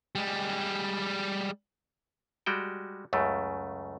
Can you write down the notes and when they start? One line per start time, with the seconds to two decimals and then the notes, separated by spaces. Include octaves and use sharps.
0.15 G3 G#3
2.46 G3 G#3 F#4 G5
3.13 C#2 F#2 C#3 A3